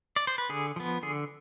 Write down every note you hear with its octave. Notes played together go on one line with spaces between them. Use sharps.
D5
C5
B4
D3 G#4
F3 B3
D3 G#4